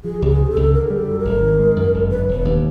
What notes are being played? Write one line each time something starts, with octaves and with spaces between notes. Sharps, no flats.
F3 G#4
C#2 G4
G#4
C3
A4
C#2
D3 A#4
G3 G#4
A4
F#2
A#4
G#1
D#3
G#3
F#2
G1
D3 B4
E1 B4
D#2